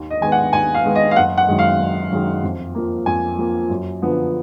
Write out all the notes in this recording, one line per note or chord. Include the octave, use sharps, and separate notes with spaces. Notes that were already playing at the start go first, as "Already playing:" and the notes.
Already playing: D#2
D#5
D#3 G#3 B3 G#5
F#5
D#2 G#5
F5
D#3 G#3 B3
D#5
F5
F#1 F#5
F#5
F#2 D#3 G#3
F5
F#1
F#2 D#3 G#3
F2
F3 A#3
F2 G#5
F3 A#3
F#2
D3 F3 B3